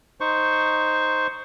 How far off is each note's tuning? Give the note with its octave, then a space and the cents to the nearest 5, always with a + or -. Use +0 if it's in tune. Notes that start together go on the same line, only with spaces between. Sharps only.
D#4 +0 C5 +0 C#6 +0